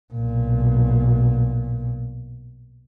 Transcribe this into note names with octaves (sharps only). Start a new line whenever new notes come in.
B1 A#2